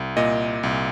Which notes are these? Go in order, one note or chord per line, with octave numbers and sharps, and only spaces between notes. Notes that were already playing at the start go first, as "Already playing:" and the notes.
Already playing: C2
A#2 D#5
C2